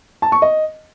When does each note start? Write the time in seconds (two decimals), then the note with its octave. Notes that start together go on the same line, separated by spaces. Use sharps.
0.22 A5
0.32 C#6
0.42 D#5